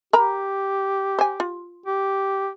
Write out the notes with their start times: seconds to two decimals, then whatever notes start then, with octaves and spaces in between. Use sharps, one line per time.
0.13 G4 A#4 A#5 B5
1.19 C5 G#5
1.40 F4
1.86 G4